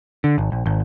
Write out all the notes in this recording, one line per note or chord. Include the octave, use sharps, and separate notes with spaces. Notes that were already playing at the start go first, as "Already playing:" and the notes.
D3
G#1
A#1
G#1